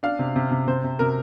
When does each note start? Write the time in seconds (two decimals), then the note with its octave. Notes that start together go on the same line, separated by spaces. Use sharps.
0.03 D4 F5
0.19 C3
0.36 C3
0.51 C3
0.67 C3 C5
0.84 C3
0.99 C3 A#4